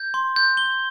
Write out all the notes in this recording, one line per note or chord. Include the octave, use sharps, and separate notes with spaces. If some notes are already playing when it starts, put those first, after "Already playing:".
Already playing: G6
C6
G6
G7